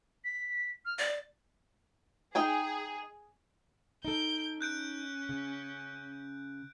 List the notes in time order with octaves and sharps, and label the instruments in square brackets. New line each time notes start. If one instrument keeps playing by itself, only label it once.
[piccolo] B6
F6
[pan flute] D5 [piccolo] A6
[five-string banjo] D#4 G5 G#5 [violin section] G#4
[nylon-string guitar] D#4 A4 [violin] G6 D7
[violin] C#4 [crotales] F#6 G6 D7
[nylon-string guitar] C#3